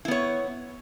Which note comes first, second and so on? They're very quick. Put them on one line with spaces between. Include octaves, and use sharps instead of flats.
E4 B3 C#5